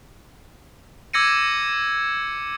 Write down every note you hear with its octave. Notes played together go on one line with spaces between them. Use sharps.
D6 E6 G#6 A#6 C#7 D#7